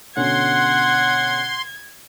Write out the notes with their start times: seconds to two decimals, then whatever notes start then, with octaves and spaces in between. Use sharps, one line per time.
0.17 B2 D3 C#4 F#5 C6 G#6